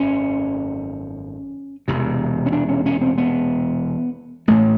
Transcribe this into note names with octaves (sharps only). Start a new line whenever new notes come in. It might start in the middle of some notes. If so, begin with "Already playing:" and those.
Already playing: G#1 F#2 C#4
E1 E2 C3
C#4
D4
C#4
C#4
C4
B3
A1 A2 A3